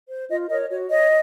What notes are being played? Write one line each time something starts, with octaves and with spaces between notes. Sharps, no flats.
C5
F4 D#5
A#4 C#5 D#5
F#4 C#5
C#5 D#5